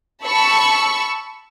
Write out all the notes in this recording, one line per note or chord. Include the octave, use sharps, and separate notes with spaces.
A5 B5 C#6 E6